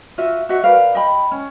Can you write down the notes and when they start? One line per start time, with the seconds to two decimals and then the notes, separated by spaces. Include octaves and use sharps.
0.18 F4 F#4 E5
0.49 F#4 D#5 E5 F#5
0.64 A#4 B4 D5 F5
0.95 D#5 G5 B5
1.31 C#4